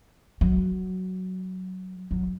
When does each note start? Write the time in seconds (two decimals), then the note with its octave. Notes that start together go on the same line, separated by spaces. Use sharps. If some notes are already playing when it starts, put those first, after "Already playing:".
0.41 F#3
2.11 F#3